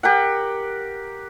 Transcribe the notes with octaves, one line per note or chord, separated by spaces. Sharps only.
G4 A#4 F#5